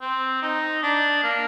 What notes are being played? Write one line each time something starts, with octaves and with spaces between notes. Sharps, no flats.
C4
D#4
D4
A#3